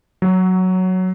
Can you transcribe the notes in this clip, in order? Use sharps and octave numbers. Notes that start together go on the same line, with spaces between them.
F#3